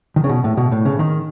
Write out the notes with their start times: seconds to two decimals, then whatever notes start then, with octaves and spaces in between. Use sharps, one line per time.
0.16 D#3
0.24 C#3
0.29 B2
0.44 A2
0.57 B2
0.72 A2
0.85 C#3
0.99 D#3